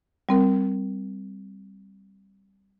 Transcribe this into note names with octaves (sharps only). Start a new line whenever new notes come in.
G3 C4 A#4